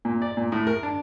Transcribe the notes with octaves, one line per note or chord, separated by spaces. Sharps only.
A#2
D5
A#2
A2
A#4
D4